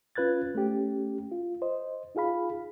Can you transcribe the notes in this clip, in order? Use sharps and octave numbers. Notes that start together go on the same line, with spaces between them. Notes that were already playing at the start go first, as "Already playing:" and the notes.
C#4 F4 B4 F#6 G#6 A6
A3 C#4 G4
F4
C5 D#5
D#4 F4 G#4 F5 B5